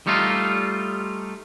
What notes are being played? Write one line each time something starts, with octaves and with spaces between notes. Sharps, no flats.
G3 A3 D#4 F4